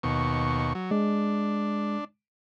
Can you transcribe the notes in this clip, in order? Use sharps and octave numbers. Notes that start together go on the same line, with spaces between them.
D#2 B2 C#6
F#3
G#3 D4